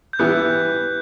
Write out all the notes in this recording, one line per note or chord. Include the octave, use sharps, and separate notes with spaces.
G6
E3 G3 B3 E4 F#6